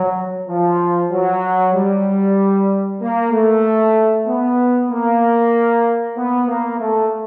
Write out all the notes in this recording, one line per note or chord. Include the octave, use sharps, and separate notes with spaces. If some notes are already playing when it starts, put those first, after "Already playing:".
Already playing: F#3
F3
F#3
G3
A#3
A3
B3
A#3
B3
A#3
A3